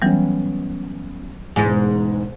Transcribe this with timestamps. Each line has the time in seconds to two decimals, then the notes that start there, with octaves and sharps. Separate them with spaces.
0.02 E3 F#3 G3 B3 C#4
1.56 E1 E2 G#2 B3 G#5